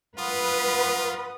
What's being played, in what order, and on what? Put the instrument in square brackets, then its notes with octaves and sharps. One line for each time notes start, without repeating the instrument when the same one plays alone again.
[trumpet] F4 [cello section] B4 [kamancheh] F#5 D#6